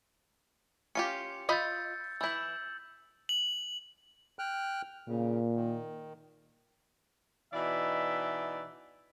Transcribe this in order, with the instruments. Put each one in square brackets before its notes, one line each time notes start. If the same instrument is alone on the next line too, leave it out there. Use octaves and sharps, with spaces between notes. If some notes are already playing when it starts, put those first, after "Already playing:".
[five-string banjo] C#4 F4 G4 [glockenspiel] C#7
[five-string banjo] F4 D#5 B5 [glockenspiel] E6 G6 A6
[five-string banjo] E3 E4 [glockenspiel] E6 G6 F#7
[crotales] F#7
[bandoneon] G5 F6 F#6
[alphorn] A#2 [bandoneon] C#3
[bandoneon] D#3
[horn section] B2 E3 D#4 D5 E5